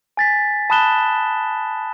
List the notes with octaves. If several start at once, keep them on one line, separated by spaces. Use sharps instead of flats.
G#5 A6 B6
A5 B5 D#6 F#6 E7 G7